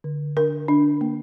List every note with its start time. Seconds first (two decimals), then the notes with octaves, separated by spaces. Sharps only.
0.04 D3
0.37 D4 A#4
0.68 D3 D4
1.01 A#3